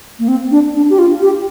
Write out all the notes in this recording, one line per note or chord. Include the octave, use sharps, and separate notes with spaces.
A#3
C4
D4
D4
G4
F4
G4